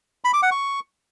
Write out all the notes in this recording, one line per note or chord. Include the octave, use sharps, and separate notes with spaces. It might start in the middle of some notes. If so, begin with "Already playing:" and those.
B5
D6
F#5
C#6